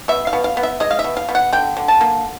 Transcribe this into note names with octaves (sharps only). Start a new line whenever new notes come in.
B2 E5
F5
B2
F5
B3
E5
G#3 D#5
F5
E5
B2
F5
B2
F#5
D3 G5
D3
A5
A#3